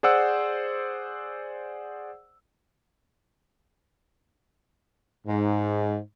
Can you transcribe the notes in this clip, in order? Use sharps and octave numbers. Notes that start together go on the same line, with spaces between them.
G#4 C5 D5 F#5 E6
G#2